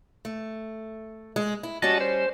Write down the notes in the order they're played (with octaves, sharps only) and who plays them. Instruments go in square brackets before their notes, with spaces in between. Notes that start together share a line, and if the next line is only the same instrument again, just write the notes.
[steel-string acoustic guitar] A3
G#3
E4
[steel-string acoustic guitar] G3 C#4 [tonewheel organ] F#4 D#5 A5
[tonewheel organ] C5